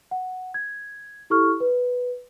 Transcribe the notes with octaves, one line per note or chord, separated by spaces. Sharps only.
F#5
G#6
E4 G4 A4 C#6 F6
B4